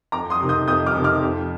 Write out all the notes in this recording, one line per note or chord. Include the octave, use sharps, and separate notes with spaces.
F2 A#5 D6
C6 D#6
C3 D#3
D#6 G6
F2 D#6 G6
D6 F6
C3 D#3
D6 F6
F2